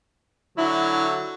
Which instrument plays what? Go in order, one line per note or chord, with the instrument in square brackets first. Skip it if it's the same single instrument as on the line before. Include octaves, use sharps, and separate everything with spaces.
[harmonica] D3 F#3 [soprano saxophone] E4